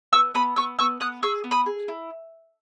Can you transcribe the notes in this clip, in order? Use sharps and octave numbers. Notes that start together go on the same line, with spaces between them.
B3 C#6 E6
B3 B5 D#6
B3 C#6 E6
B3 C#6 E6
B3 D#6 F#6
G#4 C#6 E6
B3
B5 D#6
G#4
E4